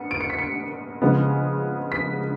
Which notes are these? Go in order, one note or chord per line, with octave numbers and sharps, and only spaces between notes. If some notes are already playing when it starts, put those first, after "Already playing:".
Already playing: B3 C#7
D7
C#7
B6
C#7
C#3 F3 G#3 B3
B6